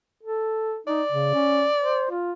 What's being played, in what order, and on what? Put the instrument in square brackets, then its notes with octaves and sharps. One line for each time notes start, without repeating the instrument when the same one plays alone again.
[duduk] A4
[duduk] D#4 [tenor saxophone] D5
[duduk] C#3
C#4
C5
F4